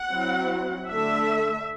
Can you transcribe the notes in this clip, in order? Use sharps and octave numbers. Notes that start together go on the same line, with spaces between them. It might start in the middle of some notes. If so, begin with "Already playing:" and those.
Already playing: F#5
F#3 C4 E4
D3 A3 D4 E5